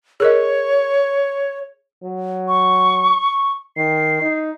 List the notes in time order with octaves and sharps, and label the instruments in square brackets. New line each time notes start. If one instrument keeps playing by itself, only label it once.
[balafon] G#4 A#4 D#5 [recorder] C#5
[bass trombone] F#3
[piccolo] C#6
[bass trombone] D#3 [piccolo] C7
[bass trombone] D#4